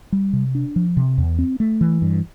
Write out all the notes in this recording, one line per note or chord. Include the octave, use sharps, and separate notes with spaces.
G3
C3
D4
F3
C3
E2
C4
A3
E3
G2